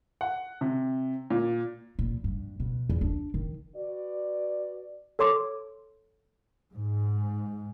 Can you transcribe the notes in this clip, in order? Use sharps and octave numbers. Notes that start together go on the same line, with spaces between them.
F#5
C3
A#2
A#2
G2
B2
E2
D4
D#3
F#4 B4 D5
A4 C#5 C6 D6
G#2